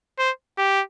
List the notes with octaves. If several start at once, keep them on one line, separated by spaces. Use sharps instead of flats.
C5
G4